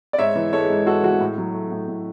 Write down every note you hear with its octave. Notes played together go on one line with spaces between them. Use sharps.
D5
G#2 C#5 E5
E3
G#3 A4 C#5
G#2
G#2 F#4 A4
E3 F#4
A2
F#3
A3
A2
A2